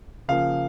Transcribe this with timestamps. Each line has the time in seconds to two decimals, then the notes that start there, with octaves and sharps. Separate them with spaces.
0.28 C#3 F3 A#3 F5